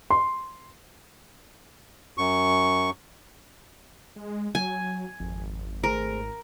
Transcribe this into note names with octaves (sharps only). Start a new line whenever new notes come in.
C6
F#2 C#6
G#3
F#3 G#5
G#1 F2
A3 G#4 A#4 C5